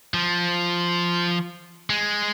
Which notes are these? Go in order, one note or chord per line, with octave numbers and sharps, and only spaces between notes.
F3
G#3